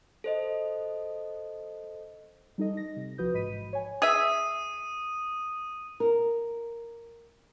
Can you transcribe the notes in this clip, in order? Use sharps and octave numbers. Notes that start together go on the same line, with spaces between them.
A4 C5 D#5
G3 D#4 A4 D#5
A#6
C3
B1 F3 F#4 B4 D#6 G6
A1 G#2 D#5 B5 B6 D#7
C#5 G#5
G#4 E5 D#6 D#7
A#4